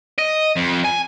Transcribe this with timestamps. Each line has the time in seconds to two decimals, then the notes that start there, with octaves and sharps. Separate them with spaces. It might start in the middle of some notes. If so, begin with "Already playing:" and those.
0.19 D#5
0.57 F2
0.85 G#5